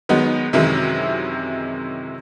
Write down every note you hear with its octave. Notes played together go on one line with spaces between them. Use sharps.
D#3 F#3 G#3 B3 D#4
F#2 C3 D#3 E3 G#3 E4